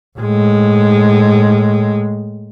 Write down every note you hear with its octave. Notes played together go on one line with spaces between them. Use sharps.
A2 G#3